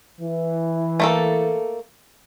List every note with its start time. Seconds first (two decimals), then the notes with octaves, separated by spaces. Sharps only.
0.20 E3
1.00 A3 A#3 A4